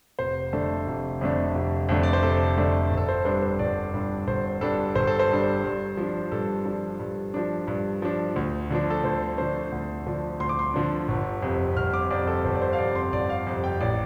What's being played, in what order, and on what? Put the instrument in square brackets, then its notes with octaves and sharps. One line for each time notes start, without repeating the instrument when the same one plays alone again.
[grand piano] F1 C5
F2 D3 A3 D4 A4
F1
F2 D3 A3 D4
F1
F2 D3 A3 D4
D5
C5
F1 A4
F2 D3 A3 D4
G1
A4
C5
G2 G3 D4 C5
C5
G1 D5
G2 G3 D4
G1 C5
G2 G3 D4 A4
G1 C5
A4
C5
G2 G3 D4
G2
F3 D4
G2 A4
F3 D4
G2
F3 D4
G2
F3 D4
D2
D3 F3 D4
A4
D2 C5
D3 F3 D4 C5
D2
D3 F3 D4
D2 C6
D6
C6
D3 F3 D4
G1
F2 C3
G1 F6
D6
F2 C3 D5
A4
G1 C5
D5
C5
F5
F2 C3 D5
C6
G1 D5
F5
F2 C3
G5
A1 D5